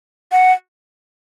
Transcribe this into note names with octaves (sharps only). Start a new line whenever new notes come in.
F#5